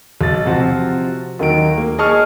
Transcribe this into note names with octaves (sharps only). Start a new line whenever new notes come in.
B1 A6
C3 F3 F4 F#4
D#2 D#3 F#3 D7
A#3
G#4 D#5 A5 C#6 F6